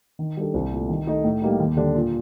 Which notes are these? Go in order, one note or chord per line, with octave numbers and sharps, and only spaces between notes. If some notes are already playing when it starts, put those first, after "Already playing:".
D#3
G3 D4 A4
C2
A#2 A3
D#3
A3 D#4
A2
G3 A#3 D#4
D#2
D3 G3 D4
A#2